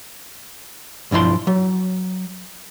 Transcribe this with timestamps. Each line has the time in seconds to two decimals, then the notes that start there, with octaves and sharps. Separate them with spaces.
1.11 B1 G2 F3 E4 C6
1.47 F#3